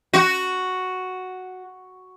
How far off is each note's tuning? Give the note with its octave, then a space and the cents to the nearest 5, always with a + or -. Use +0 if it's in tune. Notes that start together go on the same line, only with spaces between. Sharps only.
F#4 +0